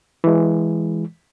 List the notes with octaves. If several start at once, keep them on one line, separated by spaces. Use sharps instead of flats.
E3 G#3